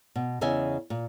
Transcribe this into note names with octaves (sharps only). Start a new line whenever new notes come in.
B2
E2 C#3 D#5 E5 G#5
A#2